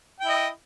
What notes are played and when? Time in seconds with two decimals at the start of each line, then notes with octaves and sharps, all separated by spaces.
0.20 G5
0.25 E4
0.29 D#5